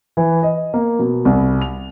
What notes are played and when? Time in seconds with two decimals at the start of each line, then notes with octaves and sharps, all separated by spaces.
0.17 E3
0.43 D#5
0.74 A#3
0.99 B2
1.25 C2
1.62 F7